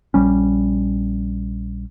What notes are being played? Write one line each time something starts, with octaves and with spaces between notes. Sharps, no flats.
A#1 G3 C#4